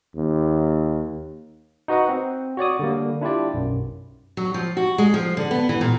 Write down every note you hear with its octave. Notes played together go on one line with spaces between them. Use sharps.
D#2
D#4 F#4 B4 D#5 F#5
C4
F#4 C#5 D5 D#6
D3 G3 A#3
D4 E4 F4 G4 D5
B1 F#2
F#3
F3
F#4
G#3
F3
D3
B3
E3
A#2